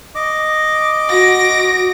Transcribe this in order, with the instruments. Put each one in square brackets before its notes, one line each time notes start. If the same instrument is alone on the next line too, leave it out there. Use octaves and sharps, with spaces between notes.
[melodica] D#5 D6
[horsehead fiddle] F#4 [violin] A#6 D7